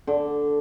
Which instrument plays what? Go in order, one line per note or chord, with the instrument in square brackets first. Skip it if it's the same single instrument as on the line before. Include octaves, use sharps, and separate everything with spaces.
[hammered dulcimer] D3